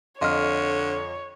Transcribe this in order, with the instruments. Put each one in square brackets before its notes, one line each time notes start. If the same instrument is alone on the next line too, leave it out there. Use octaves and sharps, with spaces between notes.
[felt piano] F2 D#5 F5 [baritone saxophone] D3 [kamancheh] C#5 [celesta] C6 F6